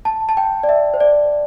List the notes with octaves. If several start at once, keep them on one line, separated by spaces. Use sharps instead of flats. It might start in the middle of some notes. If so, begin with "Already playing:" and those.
A5
A5
G5
D5
E5
C5
D5